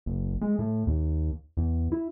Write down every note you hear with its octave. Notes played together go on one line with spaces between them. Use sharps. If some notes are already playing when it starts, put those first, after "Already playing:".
F#1
G#3
A2
D#2
E2
E4